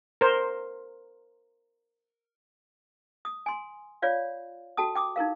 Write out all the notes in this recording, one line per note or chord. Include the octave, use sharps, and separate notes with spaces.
A#4 C5
D#6
G#5 C6
F4 C#5 D5 F5
F#4 A4 G5 A5 D#6
G5 D6 D#6
D#4 E4 A#4 F5